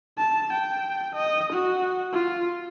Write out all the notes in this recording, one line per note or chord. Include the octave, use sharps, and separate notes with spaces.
A5
G5
D#5
F#4
F4